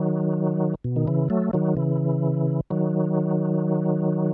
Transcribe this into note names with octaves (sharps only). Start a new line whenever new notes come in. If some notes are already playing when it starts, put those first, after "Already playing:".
Already playing: D#3 F#3
B2
D#3
C#3 E3
F#3 A3
D#3 F#3
C#3 E3
D#3 F#3